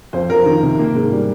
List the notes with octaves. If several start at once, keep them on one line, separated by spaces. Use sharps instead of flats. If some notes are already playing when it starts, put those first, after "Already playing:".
F2 C5
F2 A#4
D#3
C3
A#3
G#2
G3